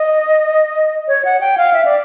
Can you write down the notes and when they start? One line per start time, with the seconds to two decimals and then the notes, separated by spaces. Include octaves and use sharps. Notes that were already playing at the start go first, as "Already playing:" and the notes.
Already playing: D#5
1.08 C#5
1.25 F#5
1.41 G5
1.58 F5
1.74 E5
1.85 D5